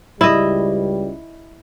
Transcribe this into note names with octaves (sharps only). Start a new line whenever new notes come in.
C#2 G3 E4 D#5